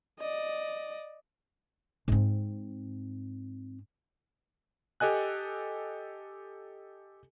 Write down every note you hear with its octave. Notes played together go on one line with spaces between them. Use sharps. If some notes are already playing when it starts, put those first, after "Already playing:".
D5 D#5
G#2 C4
G4 A4 D#5 G#5 F#6